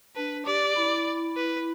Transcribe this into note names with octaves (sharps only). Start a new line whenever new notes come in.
D4 B4
G4 D5
E4
B4